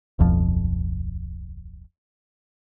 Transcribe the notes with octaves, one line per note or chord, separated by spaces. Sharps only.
D1 B1 F2 F3